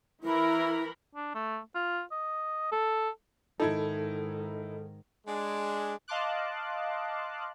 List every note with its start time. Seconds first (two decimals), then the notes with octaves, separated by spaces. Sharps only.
0.23 E3 E4 A#4 B5
1.15 D4
1.35 A3
1.75 F4
2.11 D#5
2.72 A4
3.60 G#2 D#3 D#4 E4 A4 G#6
5.27 G#3 D4
6.08 D#5 F5 A5 C6 D6 F#6